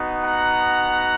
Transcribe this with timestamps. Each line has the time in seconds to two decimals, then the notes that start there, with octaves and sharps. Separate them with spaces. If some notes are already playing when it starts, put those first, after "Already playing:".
Already playing: B3 D#4 F#4
0.22 F#5 A#5